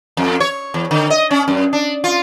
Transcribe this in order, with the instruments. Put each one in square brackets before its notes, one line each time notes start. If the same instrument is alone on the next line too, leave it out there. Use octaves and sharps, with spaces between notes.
[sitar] F2
C#5
E2
D3
D#5
C#4
F#2
D4
F4